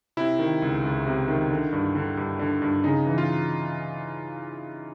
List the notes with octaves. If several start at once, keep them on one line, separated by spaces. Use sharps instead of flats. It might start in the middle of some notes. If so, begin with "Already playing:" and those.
C3 E4
D#3
C#2
C#2
C3
D#3
D3
G2
D3
G2
D3
G2
C#3 D#4
E3
F4